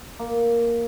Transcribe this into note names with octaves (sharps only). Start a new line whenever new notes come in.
A#3